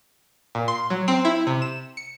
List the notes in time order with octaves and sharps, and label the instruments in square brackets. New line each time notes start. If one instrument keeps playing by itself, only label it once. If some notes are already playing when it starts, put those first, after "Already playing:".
[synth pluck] A#2
C6
F#3
C4
E4
C3
E7
C#7